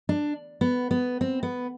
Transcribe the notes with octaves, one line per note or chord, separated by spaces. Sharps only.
D4
B3
B3
C4
B3